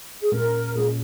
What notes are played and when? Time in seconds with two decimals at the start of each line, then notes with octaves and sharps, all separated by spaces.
0.21 G#4
0.32 A#2 G#3 C#4 A#4
0.75 A#2 G#3 C#4 G#4